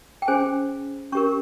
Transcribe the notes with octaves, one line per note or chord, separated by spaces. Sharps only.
G5
C#4 G#4 C5 G#5
C#4 G4 A#4 C#6